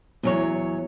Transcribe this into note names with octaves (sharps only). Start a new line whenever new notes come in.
E2 F#3 C#5